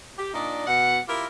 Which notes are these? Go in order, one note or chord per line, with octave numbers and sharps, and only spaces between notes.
G4
A#2 D4 D#4 D5 D#5
B2 F#5
E4 F4 G4 A#4